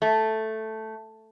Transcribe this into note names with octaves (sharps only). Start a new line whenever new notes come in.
A3